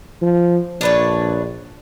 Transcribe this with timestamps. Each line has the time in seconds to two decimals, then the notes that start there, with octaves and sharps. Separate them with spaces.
0.21 F3
0.81 A#1 D4 B4 C#5